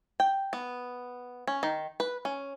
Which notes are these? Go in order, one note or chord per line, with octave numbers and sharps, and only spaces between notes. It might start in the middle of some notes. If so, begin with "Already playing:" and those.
G5
B3
C#4
D#3
B4
C#4